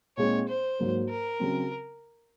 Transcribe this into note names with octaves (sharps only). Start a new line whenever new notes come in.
A#2 G#3 C4 D#4 C#5
C5
G#2 F#3 A#3
A#4
C#3 F#3 C4